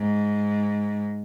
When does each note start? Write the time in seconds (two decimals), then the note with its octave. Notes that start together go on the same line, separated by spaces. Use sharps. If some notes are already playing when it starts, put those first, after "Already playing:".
Already playing: G#2